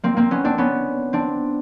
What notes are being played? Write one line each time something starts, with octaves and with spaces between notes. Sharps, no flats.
A#3 C4
A#3 C4
B3 C#4
C4 D4
B3 C#4
C4 D4